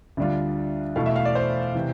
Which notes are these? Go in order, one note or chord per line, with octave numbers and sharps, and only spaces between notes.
D2 D3 G3 D4 F4
E2 B2 A3 E4 F5
E5
F5
D5
C5
C3 E3